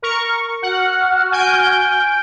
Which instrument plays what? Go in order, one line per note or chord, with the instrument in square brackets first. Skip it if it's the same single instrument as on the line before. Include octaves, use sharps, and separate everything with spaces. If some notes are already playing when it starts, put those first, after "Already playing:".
[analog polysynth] A#4 C#6
[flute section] F#4 F6 [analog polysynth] F#5
[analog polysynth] G#5 G6 D7